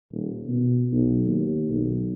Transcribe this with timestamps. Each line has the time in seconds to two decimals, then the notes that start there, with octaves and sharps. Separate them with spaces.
0.11 D#1
0.47 B2
0.92 B1
1.26 D#2
1.69 B1